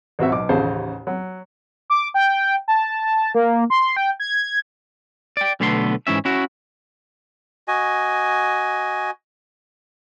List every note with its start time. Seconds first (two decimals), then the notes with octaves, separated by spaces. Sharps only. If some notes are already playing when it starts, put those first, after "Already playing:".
0.19 A1 C4 F#4 E5
0.31 B1 D6
0.49 A1 D#2 C#3 F4 C5 A5
1.07 F#3
1.90 D6
2.14 G5
2.68 A5
3.35 A#3
3.70 C6
3.97 G5
4.20 G#6
5.37 D5 G5
5.60 B1 D3 A3 B3 F#5 C6
6.07 G#2 E3 C#4 E5
6.25 C#4 E4 F#4
7.68 F#4 D#5 G#5